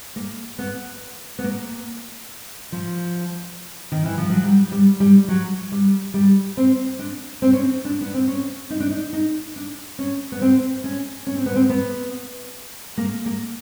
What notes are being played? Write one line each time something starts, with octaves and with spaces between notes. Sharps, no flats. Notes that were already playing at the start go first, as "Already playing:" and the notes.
A#3
B3
B3
A#3
F3
D#3
E3
F3
F#3
G3
G3
G3
F#3
G3
G3
C4
D4
C4
C#4
C4
D4
B3
C4
C#4
D#4
D4
D#4
D#4
D4
C#4
B3
C4
C#4
C#4
C4
B3
C4
B3
A#3
A#3